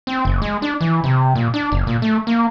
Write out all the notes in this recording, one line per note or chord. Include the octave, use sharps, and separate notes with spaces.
C4
F#1
G#3
D4
E3
C3
A#2
D4
F#1
A#2
A3
A#3